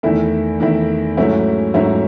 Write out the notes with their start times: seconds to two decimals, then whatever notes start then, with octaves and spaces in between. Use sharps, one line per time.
0.03 E2 D#3 A3 E4
0.60 E2 D#3 A3 E4
1.17 G#2 F#3 A3 C#4 E4
1.74 G#2 F#3 A3 C#4 E4